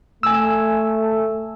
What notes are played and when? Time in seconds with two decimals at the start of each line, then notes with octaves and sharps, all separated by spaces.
0.23 A3 G#5 E6